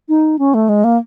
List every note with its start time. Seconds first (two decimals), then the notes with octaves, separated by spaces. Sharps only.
0.09 D#4
0.39 C#4
0.54 A3
0.69 G#3
0.84 A#3